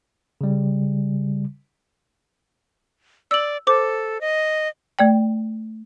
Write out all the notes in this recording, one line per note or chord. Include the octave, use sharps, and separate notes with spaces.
C#3 G3
D5 E6 F#7
A4 C5 D6
D#5
A3 D5 G5